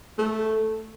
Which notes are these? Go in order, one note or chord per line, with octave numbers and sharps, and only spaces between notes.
A3